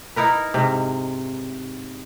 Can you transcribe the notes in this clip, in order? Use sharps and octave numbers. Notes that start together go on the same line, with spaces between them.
D#4 E4 A#4 B4
G#2 C3